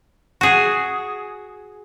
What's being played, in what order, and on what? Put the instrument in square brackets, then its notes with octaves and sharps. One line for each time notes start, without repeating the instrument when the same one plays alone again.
[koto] F#4 G#4